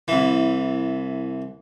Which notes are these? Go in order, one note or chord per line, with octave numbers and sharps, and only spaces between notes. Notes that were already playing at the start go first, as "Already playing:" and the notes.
C2 E3